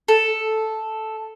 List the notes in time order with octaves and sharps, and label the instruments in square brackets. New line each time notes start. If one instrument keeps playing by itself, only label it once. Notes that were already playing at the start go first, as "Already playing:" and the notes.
[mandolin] A4